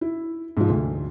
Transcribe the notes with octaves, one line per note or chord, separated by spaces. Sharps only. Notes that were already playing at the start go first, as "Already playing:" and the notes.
E4
G#2 F3
D2